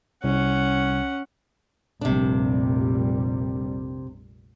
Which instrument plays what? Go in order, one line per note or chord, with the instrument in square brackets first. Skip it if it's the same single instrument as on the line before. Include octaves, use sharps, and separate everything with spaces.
[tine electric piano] C2 [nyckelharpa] C#4 F#5
[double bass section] F1 A#1 G3 [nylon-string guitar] C3 D4